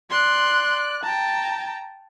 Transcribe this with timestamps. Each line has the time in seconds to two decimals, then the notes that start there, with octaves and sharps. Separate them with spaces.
0.10 D5 C6 F#6
1.04 G5 A5 A#5